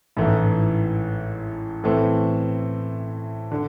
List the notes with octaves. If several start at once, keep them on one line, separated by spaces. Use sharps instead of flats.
A1 G#2 E3 A3 E4
A2 E3 A3 C4
D3